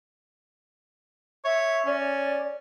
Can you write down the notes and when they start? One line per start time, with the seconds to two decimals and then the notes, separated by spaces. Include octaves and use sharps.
1.45 C#5 E5
1.86 C#4 D5